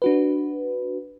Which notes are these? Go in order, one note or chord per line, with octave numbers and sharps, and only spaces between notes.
D4 F#4 B4